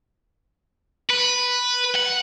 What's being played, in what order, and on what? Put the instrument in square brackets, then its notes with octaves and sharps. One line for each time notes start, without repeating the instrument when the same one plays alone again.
[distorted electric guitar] B4
F#5